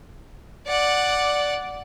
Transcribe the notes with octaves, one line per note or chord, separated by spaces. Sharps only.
D5 F#5